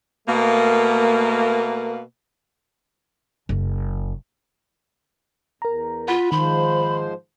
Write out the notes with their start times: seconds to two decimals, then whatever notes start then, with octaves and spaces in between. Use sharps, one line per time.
0.27 B2 A3 A#3
3.49 F#1
5.62 E2 A#4 A#5
6.08 F4 F#5 B5 B6
6.32 G#2 D#3 F3 C5 B5